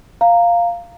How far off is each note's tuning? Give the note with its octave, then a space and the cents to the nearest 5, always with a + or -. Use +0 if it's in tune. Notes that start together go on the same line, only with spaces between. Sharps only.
F5 -5 A#5 -10